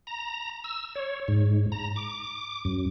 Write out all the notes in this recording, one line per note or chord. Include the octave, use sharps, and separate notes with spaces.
A#5
E6
C#5
G#2
A#5
D6
F#2